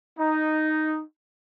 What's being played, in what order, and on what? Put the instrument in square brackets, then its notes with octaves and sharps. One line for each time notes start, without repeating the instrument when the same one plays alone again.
[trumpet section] D#4